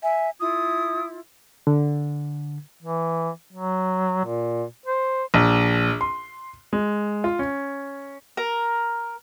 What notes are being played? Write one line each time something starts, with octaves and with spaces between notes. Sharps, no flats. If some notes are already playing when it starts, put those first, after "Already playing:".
E5 G#5
E4 F4 D#6
D3
E3
F#3
A#2
C5
A#1
C6
G#3
F4
C#4
A#4